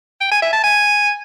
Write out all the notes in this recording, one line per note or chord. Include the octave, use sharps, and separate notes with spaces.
G5
G#5
E5
A5
G#5